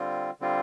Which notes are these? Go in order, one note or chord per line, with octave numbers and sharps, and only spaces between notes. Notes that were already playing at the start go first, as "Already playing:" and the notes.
Already playing: D3 G3 C4 F4
D3 G3 C4 F4